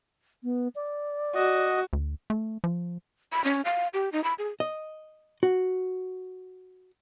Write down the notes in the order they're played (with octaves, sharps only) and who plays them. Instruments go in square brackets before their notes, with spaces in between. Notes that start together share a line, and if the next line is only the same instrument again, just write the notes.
[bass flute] B3
D5
[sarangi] F#4 [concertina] D#5
[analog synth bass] D2
A3
F3
[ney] B5
C#4
F5
G4
D#4
B5
G#4
[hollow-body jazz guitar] D#5
F#4